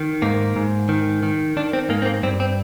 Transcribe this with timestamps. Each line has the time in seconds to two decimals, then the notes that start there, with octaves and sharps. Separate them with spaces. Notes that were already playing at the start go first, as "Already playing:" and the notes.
Already playing: D#3
0.22 G#2 A#3
0.56 G#2
0.89 D#3
1.23 D#3
1.57 D#3 D4
1.73 C4
1.89 G#2 A#3
2.02 C4
2.06 A#3
2.23 G2 C4
2.40 C4